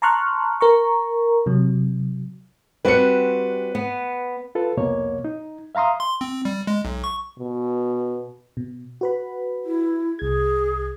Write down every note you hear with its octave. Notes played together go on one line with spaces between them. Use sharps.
A5 A#5 C6 C#6 F6 F#6
A#4 A#5 C#6
C3 F#3
G3 C4 F#4 B4 C#7
B3
F4 A4 B4
C2 F2 B2 A#3 C#5
D#4
E5 F5 A#5 C6 D#6
C6
C4
G3
G#3
B1
C#6
B2
B2
F#4 B4 B5
E4
C2 G#4 G#6